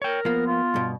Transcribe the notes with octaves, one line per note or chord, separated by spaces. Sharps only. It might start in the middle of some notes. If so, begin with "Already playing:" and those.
A#4 C#5 G5
F3 A#3 B3
F4
G2 B2